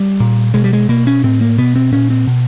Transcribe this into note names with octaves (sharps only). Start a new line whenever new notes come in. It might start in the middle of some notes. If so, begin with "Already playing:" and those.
Already playing: G3
A#2
B2 G#3
G3
G#3
B2 A#3
C#4
A2 C4
A#3
B2 B3
C4
A#2 C#4
C4
B2